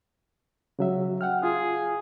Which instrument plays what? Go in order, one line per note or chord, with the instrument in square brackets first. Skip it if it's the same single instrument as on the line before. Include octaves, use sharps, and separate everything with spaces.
[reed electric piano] C#3 F#3 E5
F#5 G5 F6
[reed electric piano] F4 [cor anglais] G#4